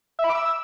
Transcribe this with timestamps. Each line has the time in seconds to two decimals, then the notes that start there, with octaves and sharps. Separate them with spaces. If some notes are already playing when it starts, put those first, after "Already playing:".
0.19 E5
0.24 B5
0.30 D6
0.35 E6